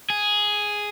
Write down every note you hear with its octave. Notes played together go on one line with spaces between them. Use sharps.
G#4